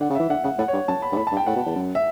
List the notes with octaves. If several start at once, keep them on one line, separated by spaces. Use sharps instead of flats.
D3 F#5
C#3
E3 E5
D3 F#5
C#3 F#5
A2 F#5
C#5
G2
F#2 A5
B5
G2
A2 B5
A5
G2
G5
A2 F#5
B2
E2
F#2
E5